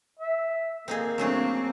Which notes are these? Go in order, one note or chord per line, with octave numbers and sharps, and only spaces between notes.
E5
A#3 C4 D#4 G#4 A4
F#3 A3 C4 D4 G#4